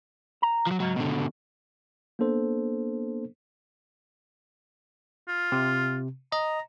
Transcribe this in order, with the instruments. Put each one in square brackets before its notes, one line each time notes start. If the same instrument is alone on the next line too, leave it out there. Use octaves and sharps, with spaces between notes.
[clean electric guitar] A#5
[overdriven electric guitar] F3 F#3
[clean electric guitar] C#2 G#2 [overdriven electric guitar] F#3
[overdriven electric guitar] B2 D3
[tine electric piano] A#3 B3 D4 A4 C5
[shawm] F4
[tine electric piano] C3
[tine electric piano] D#5 [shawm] A#5